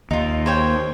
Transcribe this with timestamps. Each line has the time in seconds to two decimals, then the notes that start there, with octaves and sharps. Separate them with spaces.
0.11 D#2 D#4 F4
0.46 C5 C#5 G5